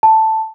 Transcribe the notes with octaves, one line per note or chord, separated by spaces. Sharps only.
A5